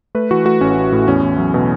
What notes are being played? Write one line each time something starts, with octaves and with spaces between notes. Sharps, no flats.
A3 B4
E3 F#4
A3 F#4
A1 C#4
A1
A2
E2 C#4
E2
F#3
B2